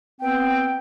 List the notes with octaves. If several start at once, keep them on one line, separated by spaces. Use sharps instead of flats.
B3 C4 G5